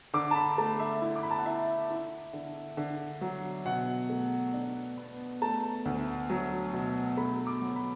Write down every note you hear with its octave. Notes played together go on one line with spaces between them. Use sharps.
D3 D6
A5
B5
A3 A5
E5
E4
D6
B5
A5
F#5
E4 E5
E4
D3
D3
F#3
B2 F#5
A3
D4
B3
A3 A5
D2
F#3
B2
A3 B5
D6
F#3
B5